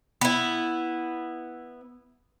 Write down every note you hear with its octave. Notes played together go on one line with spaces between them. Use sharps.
B3 E4